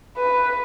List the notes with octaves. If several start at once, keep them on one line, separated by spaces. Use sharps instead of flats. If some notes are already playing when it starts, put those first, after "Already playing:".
B4